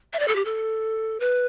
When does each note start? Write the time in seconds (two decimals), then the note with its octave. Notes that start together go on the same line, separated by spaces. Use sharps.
0.13 E5
0.19 D5
0.28 A4
0.36 G4
0.45 A4
1.20 B4